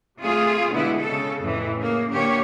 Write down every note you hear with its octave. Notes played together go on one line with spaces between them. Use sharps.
C3 A3 F4 G#4
B2 D3 G#3 B3 E4
C#3 A4
F2 A2 E3
C#3 A#3
A#2 D3 A#3 G4 C#5